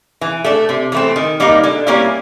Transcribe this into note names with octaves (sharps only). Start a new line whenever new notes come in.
E3
A3 D4
C3
E3 A3 C4
D#3
G3 A#3 D#4
D3
G3 A#3 C#4 E4